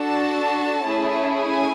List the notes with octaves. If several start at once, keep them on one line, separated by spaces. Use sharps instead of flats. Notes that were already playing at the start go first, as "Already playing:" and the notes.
Already playing: D4 F#4 A4 A5
A3 C#4 E4 G#4
G#5